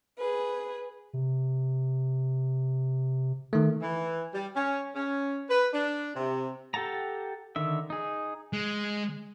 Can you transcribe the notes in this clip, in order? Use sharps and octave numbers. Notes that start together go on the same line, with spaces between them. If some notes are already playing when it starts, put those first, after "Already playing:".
G#4 B4
C3
D#3 A3
E3
G3
C#4
C#4
B4
D4
C3
G4 A4 F#5 A5 A#5
D3 D#3 E5
D#4 G#4
G#3